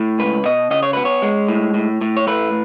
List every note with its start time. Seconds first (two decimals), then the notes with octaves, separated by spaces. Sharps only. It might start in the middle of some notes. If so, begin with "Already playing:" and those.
Already playing: A2
0.19 C#2 B4
0.45 B2 D#5
0.71 C#3 D#5
0.83 C#5
0.93 B3 B4
1.05 C#5
1.22 G#3
1.48 A2
1.74 A2
2.01 A2
2.17 C#5
2.27 A3 B4